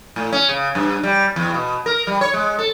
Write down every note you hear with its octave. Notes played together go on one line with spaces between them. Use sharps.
A2
C#4
C#3
G2
G3
E2
B2
A#4
G3
C#5
G#3
A4